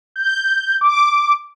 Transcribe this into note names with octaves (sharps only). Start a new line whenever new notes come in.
G6
D6